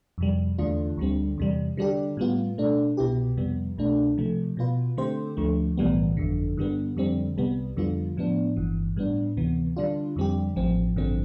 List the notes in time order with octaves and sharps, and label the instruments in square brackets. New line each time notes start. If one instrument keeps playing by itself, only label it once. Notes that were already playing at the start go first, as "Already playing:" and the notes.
[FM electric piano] F2 C3 G3
E2 D3 A3 D4 F4
D2 D3 G3 C4
E2 C3 G3
D3 G3 D4 G4
A2 G3 B3 F4
B2 A3 D4
C2 B2 B3 E4 G4
F2 C3 G3 B3
C2 B2 A3 D4
C3 F3 A3
B2 B3 F4 B4
D3 A3 C4 G4 C5
D2 D3 F3 A3
B1 A2 E3 G3 B3
G1 F2 D3
G2 D3 G3 B3
F2 D3 G3 C4
C2 C3 G3 B3
F2 D3 G3 B3 F4
A2 F3 B3 D4
G1 G2 E3
A2 G3 B3 D4
D2 C3 E3 B3
D3 G3 D4 F4
F2 D3 G3 C4 G4
A1 A2 F3 C4
A1 G2 D3 F3 C4